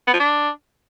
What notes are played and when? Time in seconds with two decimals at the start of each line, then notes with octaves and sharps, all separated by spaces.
0.07 B3
0.13 F3
0.20 D4